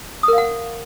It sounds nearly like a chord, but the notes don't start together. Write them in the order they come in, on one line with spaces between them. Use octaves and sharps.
D#6 A#4 F5 F#5